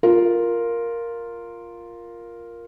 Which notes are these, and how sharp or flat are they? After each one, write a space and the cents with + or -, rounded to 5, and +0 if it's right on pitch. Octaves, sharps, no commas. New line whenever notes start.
F4 +0 A#4 +0